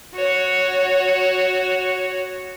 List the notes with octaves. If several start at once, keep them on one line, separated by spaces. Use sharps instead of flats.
F#4 C#5